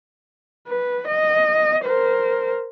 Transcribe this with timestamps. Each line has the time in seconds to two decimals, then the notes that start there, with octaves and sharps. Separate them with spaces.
0.68 B4
1.07 D#5
1.85 A#4 C5